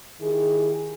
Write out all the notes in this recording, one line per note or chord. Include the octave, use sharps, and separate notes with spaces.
D#3 E4 G4 G#4